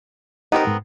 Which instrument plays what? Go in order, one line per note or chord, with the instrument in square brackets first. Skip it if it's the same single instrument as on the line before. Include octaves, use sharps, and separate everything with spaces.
[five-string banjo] B3 C4 A#4 [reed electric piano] D#4 G4 C5
[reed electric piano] G#2